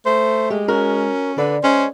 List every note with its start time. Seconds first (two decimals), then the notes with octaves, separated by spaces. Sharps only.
0.06 A3 C5
0.50 G#3 G4
0.68 C#4 F#4 A#4
1.38 D3 B4 D5
1.64 G#3 C#4 C5